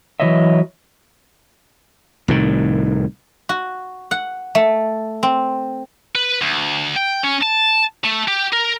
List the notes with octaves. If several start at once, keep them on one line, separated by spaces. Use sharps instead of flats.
E3 F#3 G3 C#5 D#5 E5
C2 A2 D#3
F#4
F#5
A3
C4
B4
D2
G5
C#4
A5
A3
G4
A#4